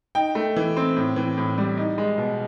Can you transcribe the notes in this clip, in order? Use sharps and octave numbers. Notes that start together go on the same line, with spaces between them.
D#4 G5
A3
E3
C4
A2
E3
A2
G3
D#4
G#3
B2